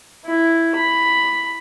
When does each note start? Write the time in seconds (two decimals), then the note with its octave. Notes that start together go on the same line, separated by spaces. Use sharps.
0.25 E4
0.75 B5